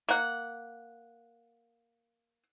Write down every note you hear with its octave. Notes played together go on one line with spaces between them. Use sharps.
A#3 F#5